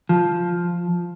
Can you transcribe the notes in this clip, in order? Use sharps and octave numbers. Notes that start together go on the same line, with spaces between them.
F3